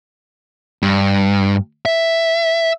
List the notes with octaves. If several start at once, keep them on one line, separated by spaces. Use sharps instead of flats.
G2
E5